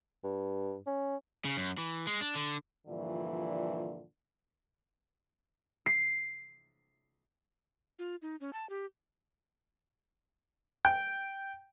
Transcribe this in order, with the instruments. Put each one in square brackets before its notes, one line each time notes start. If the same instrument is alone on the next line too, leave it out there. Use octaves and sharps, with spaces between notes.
[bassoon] G2
C#4
[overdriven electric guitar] C#3
F#2
E3
G#3
D4
D3
[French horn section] G2 A#2 D3 E3 F3
[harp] C7
[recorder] F4
D#4
C#4
A5
G4
[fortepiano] G5